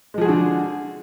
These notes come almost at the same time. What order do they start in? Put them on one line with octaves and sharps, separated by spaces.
G#3 F3 G#4 F#4 D3